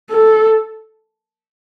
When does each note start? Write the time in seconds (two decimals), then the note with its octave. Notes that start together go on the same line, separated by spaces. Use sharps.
0.11 A4